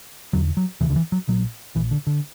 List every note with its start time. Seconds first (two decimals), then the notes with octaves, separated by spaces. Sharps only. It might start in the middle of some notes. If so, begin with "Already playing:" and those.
0.33 E1 E2 D3 F#3
0.57 F#3
0.80 E1 D2 C#3 E3
0.90 D3
0.96 E3
1.12 F#3
1.28 A#1 A#2 F#3
1.75 A#1 A#2 E3
1.91 D3
2.07 D3